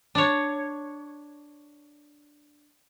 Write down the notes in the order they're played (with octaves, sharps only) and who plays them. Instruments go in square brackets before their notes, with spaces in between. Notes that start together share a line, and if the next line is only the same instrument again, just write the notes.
[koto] D4 C#5